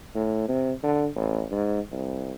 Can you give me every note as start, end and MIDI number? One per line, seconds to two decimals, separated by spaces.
0.15 0.46 45
0.48 0.73 48
0.83 1.08 50
1.16 1.44 33
1.51 1.80 44
1.92 2.34 36